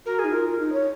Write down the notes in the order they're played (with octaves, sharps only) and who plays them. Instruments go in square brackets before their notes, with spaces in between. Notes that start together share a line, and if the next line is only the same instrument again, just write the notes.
[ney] F#4 [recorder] A#4
[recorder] G#4
[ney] D#4
[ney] F4 [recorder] A#4
[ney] D#4
C#5